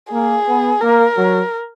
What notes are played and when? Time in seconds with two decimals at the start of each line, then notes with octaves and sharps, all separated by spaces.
0.12 A#3 G#4
0.48 B3
0.81 A#3 A#4
1.17 F#3